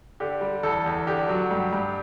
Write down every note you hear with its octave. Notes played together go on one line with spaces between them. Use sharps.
D3 G4
G3
E2 A4
E2
D3 G4
F#3
G2
G2